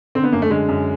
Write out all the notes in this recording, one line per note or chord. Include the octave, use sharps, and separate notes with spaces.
D3 C4
B3
F#2 A#3
A3
D3 G#3
F#2